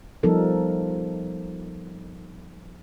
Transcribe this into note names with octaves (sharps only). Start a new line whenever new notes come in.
F3 G3 B3 D#4 A4 A#4